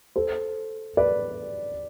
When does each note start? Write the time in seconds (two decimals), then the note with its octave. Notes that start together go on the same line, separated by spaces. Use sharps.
0.16 A4 C5
0.97 B4 D5